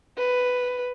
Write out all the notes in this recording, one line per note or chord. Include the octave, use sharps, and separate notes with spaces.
B4